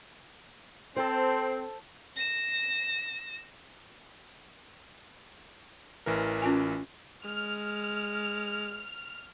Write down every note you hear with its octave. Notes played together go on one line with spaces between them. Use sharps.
C4 A4 C5
A#6 E7
A1 E3 A#4
C#4 F4 G#5
G#3 F6